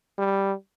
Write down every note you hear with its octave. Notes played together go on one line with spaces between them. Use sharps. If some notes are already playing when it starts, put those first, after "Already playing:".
G3